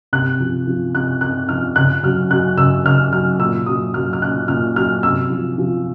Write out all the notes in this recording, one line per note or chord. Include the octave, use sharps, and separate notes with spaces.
C3 F#6
F3
F3
C3 F#6
C3 F#6
F3 F6
C#3 F#6
F#3 F6
F#3 F#6
C#3 E6
C#3 F6
F#3 F6
A#2 E6
F#3 D#6
F#3 F6
F6
A#2 F#6
A#2 F6
F#3 F6
C3 E6
F3
F3